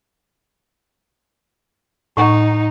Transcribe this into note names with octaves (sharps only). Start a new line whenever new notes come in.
A2 D#4 F#5 C#6